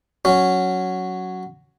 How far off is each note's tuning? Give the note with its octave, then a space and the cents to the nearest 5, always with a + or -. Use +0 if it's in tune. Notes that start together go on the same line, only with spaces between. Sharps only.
F#3 +0 C#4 +0